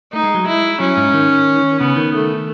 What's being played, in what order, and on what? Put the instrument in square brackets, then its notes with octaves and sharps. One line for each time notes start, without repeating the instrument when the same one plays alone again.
[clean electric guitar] A3 [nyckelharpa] D#4
[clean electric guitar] G#3
F#3
[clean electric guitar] G#3 [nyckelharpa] E4
[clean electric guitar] F#3 [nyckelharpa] C#4
[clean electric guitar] G#2
D#3
[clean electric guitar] C#3 [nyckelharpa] B3
[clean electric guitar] D#3
[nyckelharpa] A3